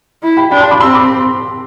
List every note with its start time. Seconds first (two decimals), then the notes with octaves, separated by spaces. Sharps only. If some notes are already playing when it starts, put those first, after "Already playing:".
0.23 E4
0.37 G5 B5
0.51 D4 G5 B5
0.61 A5 C6
0.71 B5 D6
0.80 C4 C6 E6
0.94 B5 D6